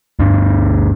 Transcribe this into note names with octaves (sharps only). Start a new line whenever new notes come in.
D2 G2 D4